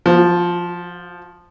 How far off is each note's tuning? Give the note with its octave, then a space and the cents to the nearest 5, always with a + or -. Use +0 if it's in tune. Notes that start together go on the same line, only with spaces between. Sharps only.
F3 +0 F#4 -35